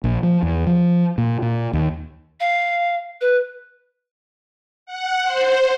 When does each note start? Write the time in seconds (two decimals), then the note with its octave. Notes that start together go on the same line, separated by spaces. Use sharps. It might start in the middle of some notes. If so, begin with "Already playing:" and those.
0.04 A#1
0.23 F3
0.43 E2
0.67 F3
1.18 A#2
1.42 A#2
1.73 D#2
2.40 F5
3.21 B4
4.86 F#5
5.23 C5